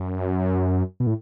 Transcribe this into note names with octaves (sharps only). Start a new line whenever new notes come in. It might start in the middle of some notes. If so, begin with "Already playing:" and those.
Already playing: F#2
B2
A2